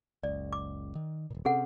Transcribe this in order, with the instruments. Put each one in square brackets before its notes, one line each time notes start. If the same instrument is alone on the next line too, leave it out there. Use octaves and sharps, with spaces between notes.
[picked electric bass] F#1 C#2 [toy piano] D5
[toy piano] D6
[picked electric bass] D#3
D#1 A#2
[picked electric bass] C3 C4 C#4 [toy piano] G#4 A4 F#5